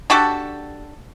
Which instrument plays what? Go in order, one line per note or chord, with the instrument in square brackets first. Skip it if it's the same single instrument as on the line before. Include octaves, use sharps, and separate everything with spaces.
[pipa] D4 F#4 G4 A4